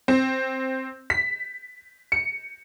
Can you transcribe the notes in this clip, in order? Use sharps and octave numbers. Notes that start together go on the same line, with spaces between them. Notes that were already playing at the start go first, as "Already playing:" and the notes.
C4
B6
C#7